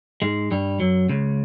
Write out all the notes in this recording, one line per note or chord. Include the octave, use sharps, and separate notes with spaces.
G#2 G#3
G2 G3
F#2 F#3
C#2 C#3